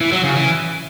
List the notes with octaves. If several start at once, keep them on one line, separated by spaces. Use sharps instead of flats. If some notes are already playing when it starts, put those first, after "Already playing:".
E3
F#3
C#3
E3